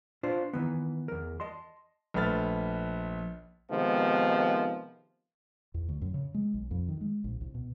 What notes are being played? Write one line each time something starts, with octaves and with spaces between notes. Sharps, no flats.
D4 F4 C5
D#3 E3 B3
E2 A#4
D#5 A5 C6
A#1 A3 B4 F6 A6
C3 D#3 F3 G#3 B3
E2
D2
F#2
C#3
G#3
B1
F2
D#3
G#3
A#1
C2
B2